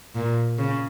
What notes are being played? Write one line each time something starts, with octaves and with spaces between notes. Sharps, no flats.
A#2
C#3